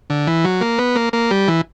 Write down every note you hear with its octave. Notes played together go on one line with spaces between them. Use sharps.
D3
E3
F#3
A#3
B3
A#3
A#3
G3
E3